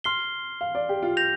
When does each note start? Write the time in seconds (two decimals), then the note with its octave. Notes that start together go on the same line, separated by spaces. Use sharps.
0.04 C6 F6 C7 G7
0.61 F5
0.75 D5
0.89 G4
1.02 F4
1.17 G6 A#6 F7